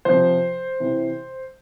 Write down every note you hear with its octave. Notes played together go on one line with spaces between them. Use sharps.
C3 F3 C5
C3 E3